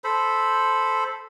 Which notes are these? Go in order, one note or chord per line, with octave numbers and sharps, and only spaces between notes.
A4 C5 B5